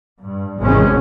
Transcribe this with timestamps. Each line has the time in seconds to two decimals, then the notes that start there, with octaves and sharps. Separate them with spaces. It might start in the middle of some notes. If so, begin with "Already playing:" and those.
0.22 G2
0.61 G#1 E2 C3 G#3 C#4